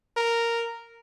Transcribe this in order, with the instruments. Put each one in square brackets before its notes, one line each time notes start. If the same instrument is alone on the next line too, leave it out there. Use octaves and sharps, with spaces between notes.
[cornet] A#4